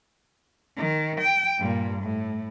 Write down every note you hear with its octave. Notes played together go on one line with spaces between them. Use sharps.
D#3
G5
G2 A#2
A2